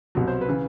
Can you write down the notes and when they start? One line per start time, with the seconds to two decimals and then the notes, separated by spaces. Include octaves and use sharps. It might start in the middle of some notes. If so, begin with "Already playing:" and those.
0.15 C2 B2 F#3
0.28 C5
0.41 B4
0.49 C#3 E3